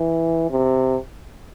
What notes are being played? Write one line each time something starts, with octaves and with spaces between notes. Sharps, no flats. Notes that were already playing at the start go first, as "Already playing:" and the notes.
Already playing: E3
C3